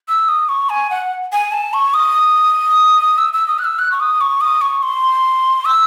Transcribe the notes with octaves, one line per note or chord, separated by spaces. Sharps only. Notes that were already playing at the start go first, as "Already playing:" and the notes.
E6
D#6
C#6
G#5
F#5
G#5
A5
C#6
D#6
E6
E6
D#6
F#6
E6
F#6
C#6
D#6
C#6
D#6
C#6
C6
E6